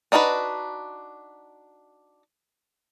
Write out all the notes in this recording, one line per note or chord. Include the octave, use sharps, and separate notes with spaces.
D4 D#4 F#4 A4 B4